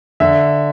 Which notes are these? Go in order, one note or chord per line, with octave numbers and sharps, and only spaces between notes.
D3 E5